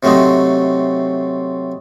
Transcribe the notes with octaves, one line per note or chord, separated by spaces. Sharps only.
C3 F#3 A3 C4 D#4